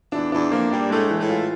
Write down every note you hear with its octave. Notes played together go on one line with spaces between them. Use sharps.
E2 E3 D4
E2 E3 D4
F2 F3 A#3
G2 G3 D4
A2 G#3 A3
E3
A2 A3
F4